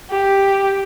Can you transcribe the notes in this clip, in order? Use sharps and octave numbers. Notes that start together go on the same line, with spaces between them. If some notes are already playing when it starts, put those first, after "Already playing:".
G4